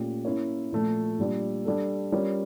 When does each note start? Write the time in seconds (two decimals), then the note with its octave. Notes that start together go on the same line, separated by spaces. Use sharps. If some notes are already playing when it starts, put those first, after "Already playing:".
Already playing: A#2 A3 C#4 G4
0.25 A#3 C#4 E4 A#4 C#5
0.72 A#2 F3 A3
1.19 A#2 G3 D4
1.65 G3 D4 A4
2.12 G3 C#4 F4 A#4 C#5